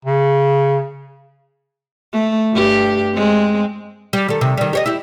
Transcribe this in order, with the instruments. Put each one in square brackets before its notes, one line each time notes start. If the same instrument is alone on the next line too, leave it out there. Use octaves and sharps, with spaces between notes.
[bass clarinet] C#3
[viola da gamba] A3
G2 G4
G#3 C4
[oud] G3
D#3 A4
C3 D#3
D#3 G3
G4 C#5 D#5
E4 G4